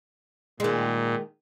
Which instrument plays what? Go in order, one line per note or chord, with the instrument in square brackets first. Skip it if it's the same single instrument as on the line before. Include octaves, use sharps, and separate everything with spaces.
[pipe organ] A#2 [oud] D#3 G#3